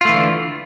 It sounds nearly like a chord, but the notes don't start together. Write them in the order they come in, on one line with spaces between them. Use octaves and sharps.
F4 A3 E3 D3